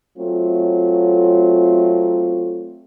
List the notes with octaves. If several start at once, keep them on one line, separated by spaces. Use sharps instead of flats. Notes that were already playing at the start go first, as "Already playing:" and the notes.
F#3 A3 C4 F4